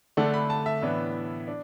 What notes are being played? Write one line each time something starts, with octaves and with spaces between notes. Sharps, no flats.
D3 A3 D4 F#5
B5
A5
E5
A2 E3 B3 D4
D4